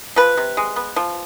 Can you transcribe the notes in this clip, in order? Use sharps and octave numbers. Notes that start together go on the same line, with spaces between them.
F3 B4
C3
G#3
B3
F3